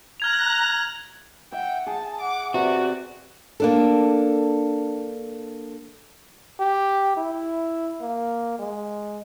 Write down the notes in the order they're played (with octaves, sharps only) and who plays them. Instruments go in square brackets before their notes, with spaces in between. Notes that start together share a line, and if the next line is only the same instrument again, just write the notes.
[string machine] A#5 F#6 A#6 [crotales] F6 G#6 F7
[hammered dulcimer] E5 [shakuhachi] F#5 [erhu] G5
[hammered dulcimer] G#4 [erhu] A5
[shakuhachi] F#5 [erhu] D6
[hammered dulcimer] C3 [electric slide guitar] F#4 [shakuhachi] B4 [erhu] D5
[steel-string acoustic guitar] A#3 D4 A4
[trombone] G4
E4
A#3
G#3